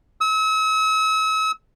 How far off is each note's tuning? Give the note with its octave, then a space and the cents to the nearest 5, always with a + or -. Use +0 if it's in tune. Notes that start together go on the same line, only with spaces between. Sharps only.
E6 -40